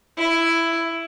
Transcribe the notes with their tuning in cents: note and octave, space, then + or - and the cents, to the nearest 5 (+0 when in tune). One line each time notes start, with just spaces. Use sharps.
E4 +10